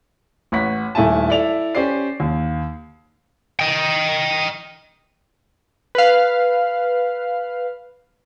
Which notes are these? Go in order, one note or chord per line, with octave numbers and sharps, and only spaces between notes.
A1 C#5 F#5 B6
D#1 A3 E4 G#5 A5
E4 A4 D5 F7
C#4 G4 C5 D5 C7
D#2
D#5 G5
B4 F5